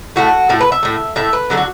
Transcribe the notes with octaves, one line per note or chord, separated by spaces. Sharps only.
A2 A3 F#4
A2 A3 A4
B4
E5
A2 A3
A2 A3 E5
B4
D3 F#3 A3
F#4